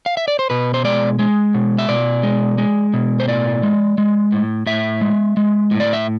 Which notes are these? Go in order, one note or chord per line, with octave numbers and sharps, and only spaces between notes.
F5
E5
D5
C5
B2 B4
C5
G#3 D5
G#3
B2
E5
B2 D5
G#3
G#3
B2
C5
A2 D5
G#3
G#3
A2
A2 E5
G#3
G#3
A2
D5
E5